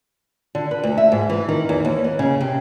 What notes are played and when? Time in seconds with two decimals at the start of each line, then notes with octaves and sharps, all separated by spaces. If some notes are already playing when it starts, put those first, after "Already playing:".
0.55 D3
0.71 B4
0.83 D2
0.98 E5
1.12 G#2
1.29 E3
1.49 D#3
1.69 E2
1.85 D#2
2.04 B3
2.19 C#3
2.41 C3